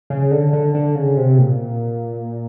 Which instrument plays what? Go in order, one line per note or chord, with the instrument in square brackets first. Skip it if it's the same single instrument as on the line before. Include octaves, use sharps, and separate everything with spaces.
[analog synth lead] C#3
D3
D3
D3
C#3
C3
A#2